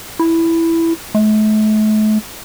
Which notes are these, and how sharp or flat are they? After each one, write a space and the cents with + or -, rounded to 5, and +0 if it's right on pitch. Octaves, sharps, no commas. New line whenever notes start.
E4 +5
A3 -40